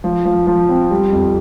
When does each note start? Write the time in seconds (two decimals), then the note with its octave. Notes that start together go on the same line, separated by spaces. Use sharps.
0.04 F3
0.25 F3
0.47 F3
0.69 C4
0.91 G3
1.12 F2